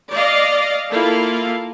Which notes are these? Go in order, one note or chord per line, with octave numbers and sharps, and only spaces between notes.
D5 D#5 F5
A#3 E4 F4 A4 F5